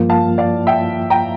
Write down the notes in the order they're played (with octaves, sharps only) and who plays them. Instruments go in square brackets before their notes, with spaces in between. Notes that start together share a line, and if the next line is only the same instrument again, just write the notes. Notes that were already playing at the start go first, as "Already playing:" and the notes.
Already playing: [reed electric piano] G2 F3 A#3 F4
[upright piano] F5 A5
D5 F5
E5 G5
G5 A#5